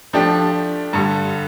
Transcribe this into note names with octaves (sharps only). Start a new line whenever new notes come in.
F3 A3 D4 G4
G2 D3 G3